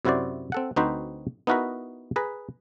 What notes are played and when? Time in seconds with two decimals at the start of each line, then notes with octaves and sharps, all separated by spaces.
0.05 F#2 C3 E4 F#4 C5 D5
0.52 C4 A4 F#5
0.76 D2 C4 D#4 F#4 B4 C5
1.47 B3 D#4 E4 F#4 A#4 B4
2.16 G#4 B4 A#5